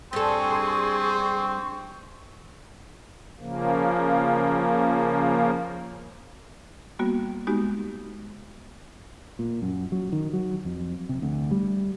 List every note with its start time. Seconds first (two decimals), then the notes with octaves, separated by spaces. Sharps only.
0.13 G2 C4 G#4 A4 C6 C#6
3.40 C#3 F3 A#3
6.99 G3 A#3 B3 F#4
7.47 G#3 B3 D#4 F#4 G4
9.39 A#2
9.62 F#2
9.92 F#3
10.12 D#3
10.33 F#3
10.65 F2
11.09 C3
11.22 D2
11.51 G3